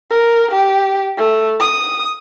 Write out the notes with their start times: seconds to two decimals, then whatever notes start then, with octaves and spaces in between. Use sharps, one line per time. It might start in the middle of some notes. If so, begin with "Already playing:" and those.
0.10 A#4
0.51 G4
1.18 A3
1.60 D#6